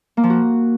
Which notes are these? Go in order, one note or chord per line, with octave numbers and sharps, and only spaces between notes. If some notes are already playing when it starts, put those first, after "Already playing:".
A#3
F3
F#4